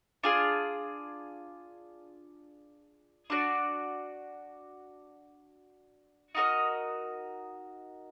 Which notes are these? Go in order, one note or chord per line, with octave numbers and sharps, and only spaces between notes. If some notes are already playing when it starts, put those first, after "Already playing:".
D4 F4 G#4
D4 F#4 D5
D#4 F#4 A#4 D#5